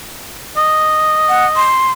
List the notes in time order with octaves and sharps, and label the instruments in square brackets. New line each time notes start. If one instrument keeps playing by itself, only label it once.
[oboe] D#5
[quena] F#5
C6